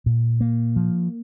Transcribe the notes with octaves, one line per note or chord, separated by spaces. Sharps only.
A#2
A#3
F3